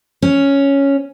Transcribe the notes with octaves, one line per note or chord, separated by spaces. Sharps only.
C#4